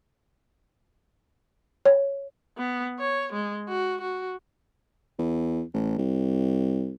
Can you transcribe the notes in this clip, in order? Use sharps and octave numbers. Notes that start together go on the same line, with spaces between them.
C#5
B3
C#5
G#3
F#4
F#4
E2
A1
C2